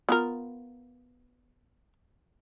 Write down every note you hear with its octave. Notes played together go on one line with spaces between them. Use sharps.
B3 F4 A#4